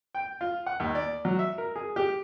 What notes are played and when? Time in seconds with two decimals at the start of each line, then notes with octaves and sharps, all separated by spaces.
0.15 G5
0.41 F4
0.66 F#5
0.80 D#2
0.95 D5
1.25 F#3
1.39 E5
1.58 A#4
1.76 G#4
1.96 G4